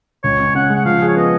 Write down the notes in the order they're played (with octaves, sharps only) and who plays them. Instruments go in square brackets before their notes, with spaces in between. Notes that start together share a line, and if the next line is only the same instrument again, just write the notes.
[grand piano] C#2 [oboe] C#5
[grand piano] C#4
[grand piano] C#3 [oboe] F#5
[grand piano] G#3
[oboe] F#5
[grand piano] F3 [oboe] F5
[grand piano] G#4
[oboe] C#5
[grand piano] B3 [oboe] D#5